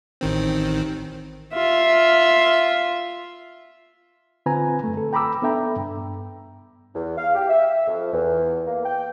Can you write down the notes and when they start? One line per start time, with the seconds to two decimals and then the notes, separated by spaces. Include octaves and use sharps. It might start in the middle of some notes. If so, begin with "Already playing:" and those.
0.21 A1 D#3 C4
1.54 F4 E5
4.46 D3 C4 F4 B4 G#5 A#5
4.84 F#2 A3
4.97 A4
5.13 G5 A#5 B5 D6 E6
5.42 B3 D4 A4 E5 G5 A#5
5.76 G2
6.95 E2
7.18 F5
7.35 G4
7.49 E5
7.87 F2
8.13 E2
8.66 A#3
8.84 G5